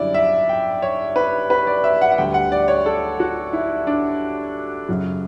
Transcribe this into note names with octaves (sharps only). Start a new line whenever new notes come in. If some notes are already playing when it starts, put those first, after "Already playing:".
Already playing: F#2 D3 G3 E4 D5
E5
G5
C#5
B4
B4
D5
E5
F#5
F#5
D2 D3 G3 G5
F#5
D5
C#5
A4
F#4
E4
D4
F#2 C#3 F#3